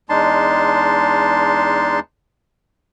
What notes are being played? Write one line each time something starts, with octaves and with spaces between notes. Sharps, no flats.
E2 G#3 D4 D#4 A5 C6